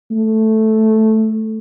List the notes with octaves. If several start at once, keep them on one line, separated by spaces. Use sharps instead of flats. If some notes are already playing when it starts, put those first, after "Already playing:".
A3